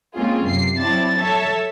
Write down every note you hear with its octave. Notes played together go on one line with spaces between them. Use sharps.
G#3 A#3 C4 C#4 F4 G#4
F#2 C3 C7
F#3 C4 E4 D5 A5 A6
A4 C#5 E5 A5